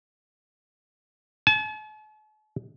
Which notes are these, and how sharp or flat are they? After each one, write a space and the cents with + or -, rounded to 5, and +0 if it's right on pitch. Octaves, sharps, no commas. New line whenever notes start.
A5 -45